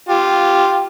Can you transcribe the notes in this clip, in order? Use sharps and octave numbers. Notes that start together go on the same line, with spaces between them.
F4 G4